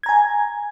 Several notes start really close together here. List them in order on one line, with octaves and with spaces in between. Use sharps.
G#6 A#5 G#5